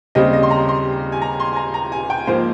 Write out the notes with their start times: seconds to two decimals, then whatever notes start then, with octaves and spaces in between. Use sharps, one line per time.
0.15 D#2 C#3 G3 C4 D#5
0.33 D#5
0.43 C6
0.51 A#5
0.69 C6
1.12 G#5
1.22 A#5
1.40 C6
1.53 G#5
1.56 A#5
1.74 A#5
1.92 G#5
2.10 G5
2.27 G#2 F3 A#3 C5